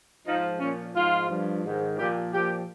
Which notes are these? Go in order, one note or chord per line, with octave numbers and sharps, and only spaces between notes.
G#2 F3 D#4
A#2 F3 C#4
G#2 F3 F4
G2 F3
G#2 D#3
A#2 F3 G4
A#2 F3 G4